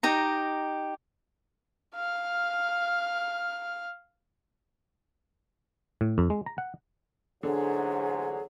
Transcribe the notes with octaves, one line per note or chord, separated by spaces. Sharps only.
D#4 G4 A#5
F5 F6
A2
F2
G#3
A#5
F#5
A1 G#2 D3 F#3 G#4